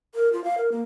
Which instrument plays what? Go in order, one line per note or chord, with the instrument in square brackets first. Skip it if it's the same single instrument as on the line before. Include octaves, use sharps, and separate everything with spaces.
[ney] A#4
F4
F5
A#4
A#3